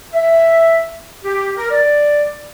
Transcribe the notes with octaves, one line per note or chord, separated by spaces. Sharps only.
E5
G4
A#4
D5